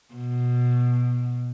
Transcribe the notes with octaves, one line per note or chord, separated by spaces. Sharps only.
B2